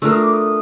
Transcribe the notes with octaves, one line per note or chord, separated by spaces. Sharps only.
A3 D4 F4 A#4 E6
D#6
D6
D#6